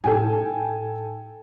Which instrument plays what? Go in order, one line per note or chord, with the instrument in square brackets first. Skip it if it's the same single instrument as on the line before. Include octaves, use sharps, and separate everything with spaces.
[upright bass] A2 D#4 [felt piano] A4 G5 G#5